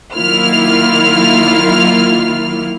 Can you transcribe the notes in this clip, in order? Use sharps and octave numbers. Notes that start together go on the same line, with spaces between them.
D#3 F#3 A#3 E4 F4 F6